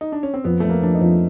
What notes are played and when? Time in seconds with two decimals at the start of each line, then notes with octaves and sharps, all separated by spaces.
0.01 D#4
0.12 D4
0.23 C#4
0.34 C4
0.44 F2 B3
0.60 F2 A3
0.70 A#3
0.82 F3 D4
0.95 D#4
1.01 F2